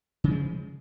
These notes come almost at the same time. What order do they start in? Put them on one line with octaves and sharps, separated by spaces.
C#3 F3 G#3